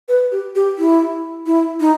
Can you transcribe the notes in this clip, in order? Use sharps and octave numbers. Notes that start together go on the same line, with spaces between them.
B4
G4
G4
E4
E4
D#4